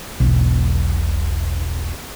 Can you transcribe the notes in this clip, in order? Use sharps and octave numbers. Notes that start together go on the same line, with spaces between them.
E1 B1